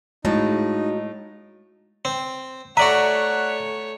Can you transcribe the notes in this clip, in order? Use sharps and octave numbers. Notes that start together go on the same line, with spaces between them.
A2 G#3 D#4 F#4 F5
C4
A3 F#4 C#5 D5 E5 F#5 A#5